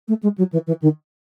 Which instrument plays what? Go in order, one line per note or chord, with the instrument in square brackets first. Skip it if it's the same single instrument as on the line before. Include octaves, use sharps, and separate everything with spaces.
[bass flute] A3
G#3
F#3
E3
E3
D#3